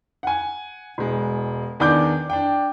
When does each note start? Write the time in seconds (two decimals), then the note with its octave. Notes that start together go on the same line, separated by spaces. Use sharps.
0.23 F#5 G#5
0.98 E1 G#3
1.80 E2 D#3 D4 D5 D6 G6
2.30 D4 G5